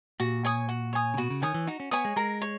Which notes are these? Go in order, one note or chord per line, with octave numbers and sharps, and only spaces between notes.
A#2 F#4
C#5 G#5 D#6
F#4
C#5 G#5 D#6
C#3
B2 F#4
C#3
D#3 C#5 G#5 D#6
E3
D#4 F#4
C#4
B3 C#5 G#5 D#6
G#3
G#3 A#4
C#5